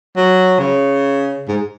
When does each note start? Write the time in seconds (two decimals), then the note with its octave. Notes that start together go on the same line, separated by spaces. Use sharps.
0.16 F#3
0.59 C#3
1.48 G#2